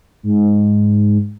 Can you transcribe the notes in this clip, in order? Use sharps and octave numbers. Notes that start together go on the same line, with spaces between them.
G#2